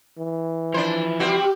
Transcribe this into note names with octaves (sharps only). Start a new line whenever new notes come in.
E3
F3 D4 E4 C5
G3 C4 F#4 G4